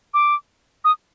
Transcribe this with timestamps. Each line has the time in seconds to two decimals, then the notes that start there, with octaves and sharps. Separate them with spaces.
0.14 D6
0.85 D#6